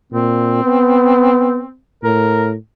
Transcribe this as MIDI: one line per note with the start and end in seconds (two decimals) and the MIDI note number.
0.12 0.60 46
0.12 1.78 60
0.64 1.62 59
2.03 2.55 45
2.03 2.48 70